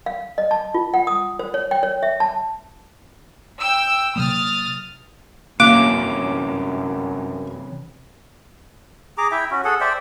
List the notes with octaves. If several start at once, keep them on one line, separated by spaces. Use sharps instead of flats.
F5
D#5
A5
F4
F#5
D#6
C5
C#5
G5
C#5
E5
A5
G5 E6
C3 F#3 A#3 D#6 F6 A6
F#2 C3 E3 A#3 C#4 D6
G#4 A#5 D6
E4 E5 G5
C#4 F#4
G#4 A4 F#5
C5 D5 E5 G5